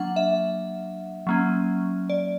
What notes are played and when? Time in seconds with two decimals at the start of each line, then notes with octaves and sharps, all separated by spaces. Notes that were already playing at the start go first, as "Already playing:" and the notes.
Already playing: F#3 A#3 D4 F#5
0.16 E5
1.27 F#3 A#3 C#4
2.10 D5